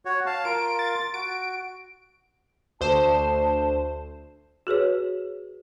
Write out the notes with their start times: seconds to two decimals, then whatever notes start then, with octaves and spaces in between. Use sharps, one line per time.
0.05 F#4 C#5
0.26 F5 A5
0.45 F4 A#4 D7
0.79 A6
1.14 F#4 D7
2.81 D2 C5 A5 E7
4.67 F#4 G#4 B4 C#5